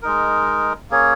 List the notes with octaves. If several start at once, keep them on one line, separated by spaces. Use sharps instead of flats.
G#3 D#4 A#4
A#3 C#4 G#4 C#5